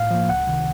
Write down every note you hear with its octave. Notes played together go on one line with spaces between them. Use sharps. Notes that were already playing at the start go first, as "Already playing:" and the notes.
Already playing: A2 F5
F3 A#3
C#2 F#5
C3 D#3